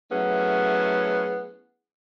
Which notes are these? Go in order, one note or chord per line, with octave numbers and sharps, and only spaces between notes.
F#3 A3 B3 C#4 E4 G#4